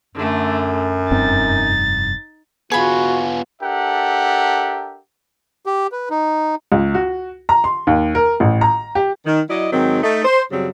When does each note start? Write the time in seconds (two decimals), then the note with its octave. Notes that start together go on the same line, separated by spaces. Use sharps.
0.15 F#2 D3 A3
1.11 F1 G2 C4 D#4 A6
2.72 B3 F4 F#4 G#4 B5
3.62 D4 G4 A4 A#4 E5 F#5
5.66 G4
5.92 B4
6.10 D#4
6.72 C#2
6.94 F#4
7.49 A#5
7.64 C6
7.87 D#2
8.15 A#4
8.40 A1
8.61 A#5
8.95 G4
9.27 D#3
9.49 F#3 E4 D5 D#5
9.73 G#2 D#3 F#3 C4
10.03 A3 D#4
10.25 C5
10.52 F#2 C#3 F#3 G3 C4